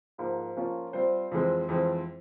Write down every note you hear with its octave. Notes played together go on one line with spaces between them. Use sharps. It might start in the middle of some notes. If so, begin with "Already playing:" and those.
G#2 F3 A#3
F3 A#3 C#4 F4
G3 C4 F4 C5
F2 E3 G#3 C4
F2 E3 G#3 C4